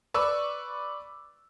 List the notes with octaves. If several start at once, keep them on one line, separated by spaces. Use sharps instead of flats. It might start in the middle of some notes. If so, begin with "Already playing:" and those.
B4 D5 C#6 E6